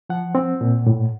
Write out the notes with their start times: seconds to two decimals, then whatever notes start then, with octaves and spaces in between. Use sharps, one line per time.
0.10 F3 F#5
0.35 C4
0.61 A#2
0.87 A2